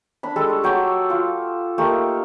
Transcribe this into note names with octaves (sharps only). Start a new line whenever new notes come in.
D4 B5
G3 G#3 A4
C#6
F#3 G5 C#6 D6
F4
A3 A#3 D#4 G4